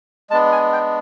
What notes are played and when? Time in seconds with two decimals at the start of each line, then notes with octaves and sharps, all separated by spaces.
0.30 G#3 B3 D4 A5
0.52 G#5
0.73 G5